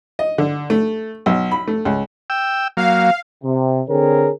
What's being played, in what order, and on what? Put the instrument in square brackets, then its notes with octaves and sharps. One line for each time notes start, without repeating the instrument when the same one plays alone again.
[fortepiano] D#5
D3
A3
B1
B5
A3
C#2
[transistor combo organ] G5 E6
[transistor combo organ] F#3 A#3 [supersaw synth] F5
[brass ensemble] C3
D3 C4 G#4 A#4 C#5